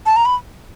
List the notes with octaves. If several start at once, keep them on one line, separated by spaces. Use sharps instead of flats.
A5
A#5
B5